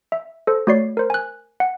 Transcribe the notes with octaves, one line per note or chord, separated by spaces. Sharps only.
E5
A4 C5
A3 F#4 C#5 D5 C7
A#4 C5
G#5 F#6
F#5